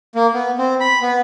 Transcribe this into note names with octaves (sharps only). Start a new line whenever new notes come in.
A#3
B3
C4
B5
B3